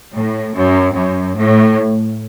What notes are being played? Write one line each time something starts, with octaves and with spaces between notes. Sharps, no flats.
A2
F#2
F#2
A2